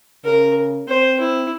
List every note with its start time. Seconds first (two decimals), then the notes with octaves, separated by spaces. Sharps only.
0.25 C#3 A#4
0.88 C4 C5
1.20 E4